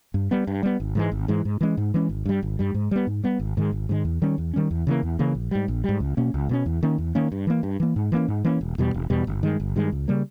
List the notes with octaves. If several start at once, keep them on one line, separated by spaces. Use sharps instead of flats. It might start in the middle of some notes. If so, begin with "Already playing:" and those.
G2
G3 B3
G2
G3 B3
G#1
G#2 E3 G#3
G#1
G#2 E3 G#3
G#2
E3 G#3 C#4
G#2
E3 G#3 C#4
G#1
G2 G3
G#1
G2 G3
G#2
G3 B3
G#2
G3 B3
G#1
G#2 D#3 G#3
G#1
G#2 D#3 G#3
E2
D#3 G3 C#4
E2
D#3 G3 C#4
E2
C#3 E3 A#3
E2
C#3 E3 A#3
A#1
G#2 G3
A#1
G#2 G3
C#2
B2 A#3 C#4
C#2
B2 A#3 C#4
E2
D#3 A#3 C#4
E2
D#3 A#3 C#4
G2
E3 A#3
G2
E3 A#3
G#2
E3 A#3 C#4
G#2
E3 A#3 C#4
E1
E2 B2 G3
E1
E2 B2 G3
G1
G2 D#3 G#3
G1
G2 D#3 G#3
C#2
C#3 G3 A#3